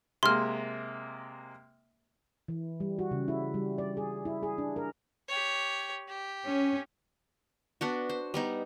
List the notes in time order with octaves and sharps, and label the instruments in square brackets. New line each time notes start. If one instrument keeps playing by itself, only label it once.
[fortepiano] C3 G#3 A#3 [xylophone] C6 F6
[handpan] E3
G3
F#4
C#3
E4
G3
D5
G#4
E4
G#4
D4
A#4
[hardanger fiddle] G4 C#5
G4
[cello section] C#4
[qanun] B3 D4 F#4
C5
G3 B3 D#4